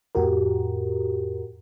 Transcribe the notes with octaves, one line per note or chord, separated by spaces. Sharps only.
F2 A2 F#4 G4 A#4